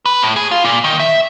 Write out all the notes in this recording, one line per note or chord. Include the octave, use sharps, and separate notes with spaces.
B4
A2
G#4
F4
A#2
D#3
E5